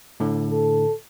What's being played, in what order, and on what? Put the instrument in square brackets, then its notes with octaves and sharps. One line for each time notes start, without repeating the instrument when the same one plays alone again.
[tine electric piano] A2 D3
[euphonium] A4